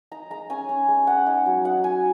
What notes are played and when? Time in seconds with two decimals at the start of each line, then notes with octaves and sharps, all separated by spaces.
0.11 D#4 A#5
0.30 G#3 A#5
0.50 C#4 G#5
0.69 C#4
0.88 G#3
1.07 D#4 F#5
1.27 D#4
1.46 F#3
1.65 D#4 F#5
1.84 D#4 G#5